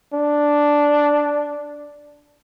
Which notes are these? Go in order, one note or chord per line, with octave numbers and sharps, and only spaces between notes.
D4